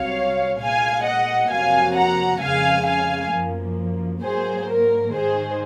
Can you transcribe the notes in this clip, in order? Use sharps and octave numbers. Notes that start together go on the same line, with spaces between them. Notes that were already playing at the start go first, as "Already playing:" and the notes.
Already playing: C2 C3 F#3 C#5 F5
A#2 G#3 F5 G#5
D#5 F#5
F2 C3 F#3 A#3 F5 G#5
F#5 A#5
F2 C#3 G#3 F5 G#5
F5 G#5
F#2 F3 A#3
G#2 F#3 A#3 G#4 C5
A#4
G#2 D#3 G#3 G#4 C5